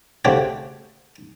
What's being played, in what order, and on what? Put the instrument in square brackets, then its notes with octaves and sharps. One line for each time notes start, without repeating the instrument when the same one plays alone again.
[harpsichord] C#3 A3 C4 F#4 G4 C#5